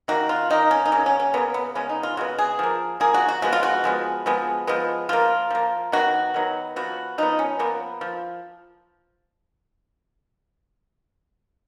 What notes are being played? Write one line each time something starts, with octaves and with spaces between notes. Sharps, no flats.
D#3 A#3 F#4
F4
D#3 A#3 D#4
C#4
D#4
C#3 F#3 A#3 C#4
C#4
C#4
C#3 F#3 A#3 B3
B3
C#3 G#3 B3 C#4
D#4
F4
C#3 G#3 B3 F#4
G#4
F3 A#3
F3 A#3 G#4
F#4
F#4
F3 G#3 B3 F#4
F4
F#4
F3 G#3 B3
F3 G#3 B3
F3 G#3 B3
F3 A#3 F4
F3 A#3
D#3 F#3 B3 F#4
D#3 F#3 B3
F3 B3 F#4
F3 B3 D#4
C#4
F3 A#3 B3
F3